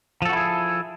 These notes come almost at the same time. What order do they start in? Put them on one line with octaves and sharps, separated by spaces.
F3 A4 F#4 E4 G#4